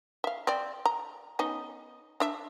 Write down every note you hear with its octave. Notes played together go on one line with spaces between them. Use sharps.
E5 F5
C4 D5
A#5
B3 C#4 D#4
D4 E5